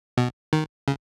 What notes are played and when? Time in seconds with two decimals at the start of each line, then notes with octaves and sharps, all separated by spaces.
0.17 B2
0.53 D#3
0.88 C#3